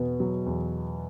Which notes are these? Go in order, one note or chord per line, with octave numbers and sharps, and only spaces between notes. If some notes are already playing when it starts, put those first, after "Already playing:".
Already playing: E2 B2 B3
F#3
E2